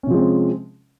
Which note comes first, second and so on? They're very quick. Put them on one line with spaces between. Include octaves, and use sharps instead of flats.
C#4 C3 F3 G#3 C4